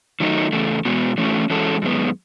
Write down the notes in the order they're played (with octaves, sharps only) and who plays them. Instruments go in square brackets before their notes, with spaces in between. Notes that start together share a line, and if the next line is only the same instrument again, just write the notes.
[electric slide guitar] D#3 F#3 A3 D#4
E2 C#3 A3
B2 G#3 B3 F#4
E3 A3 C#4 F#4
E3 G#3 C#4 F#4 A4
F#2 D#3 G#3 B3